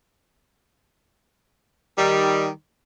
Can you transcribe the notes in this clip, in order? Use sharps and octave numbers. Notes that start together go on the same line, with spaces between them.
D#3 G3